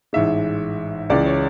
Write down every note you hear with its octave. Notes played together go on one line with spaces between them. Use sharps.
A1 G#2 G#3 E5
C#2 C#3 E3 G#3 D5
C#5